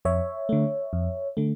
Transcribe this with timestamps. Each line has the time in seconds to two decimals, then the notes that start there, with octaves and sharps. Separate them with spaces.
0.05 F2 C#5 E5
0.49 D3 A3
0.93 F2
1.37 D3 A3